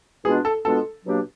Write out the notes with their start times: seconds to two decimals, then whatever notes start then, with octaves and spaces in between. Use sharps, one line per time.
0.24 B2 G#3 B3 D4 F4 G#4
0.45 A4
0.65 B2 G#3 B3 D4 F4 A4
1.05 B2 F#3 A#3 D4 G4